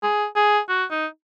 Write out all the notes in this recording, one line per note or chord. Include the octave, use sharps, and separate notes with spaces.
G#4
G#4
F#4
D#4